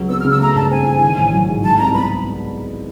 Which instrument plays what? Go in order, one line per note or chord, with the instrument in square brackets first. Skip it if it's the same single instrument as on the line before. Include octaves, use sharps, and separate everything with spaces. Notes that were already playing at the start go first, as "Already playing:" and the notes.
Already playing: [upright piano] C#2 F#3
[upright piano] B3 [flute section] E6
[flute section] F6
[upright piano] C#3
[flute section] E6
[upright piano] A3 [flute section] A#5
[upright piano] G2 [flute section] A5
[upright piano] C4 [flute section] G#5
[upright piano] E3
D#3
A1
F#3
G#2
[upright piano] F#3 [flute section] A5
[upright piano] C2 [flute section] A#5
[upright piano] B3 [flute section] B5